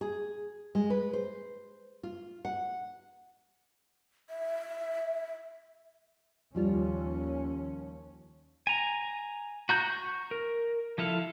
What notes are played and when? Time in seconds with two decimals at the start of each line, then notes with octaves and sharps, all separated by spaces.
0.01 G#4
0.75 G#3
0.90 B4
1.13 C5
2.03 F4
2.45 F#5
4.30 E5
6.55 D#2 F3 G3 C#4 F4
8.67 G#5 A#5
9.69 F#4 A#5 G6
9.90 C#6
10.31 A#4
10.98 F3 E4 A4 F5